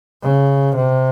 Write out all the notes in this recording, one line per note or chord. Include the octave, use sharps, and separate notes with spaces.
C#3
C3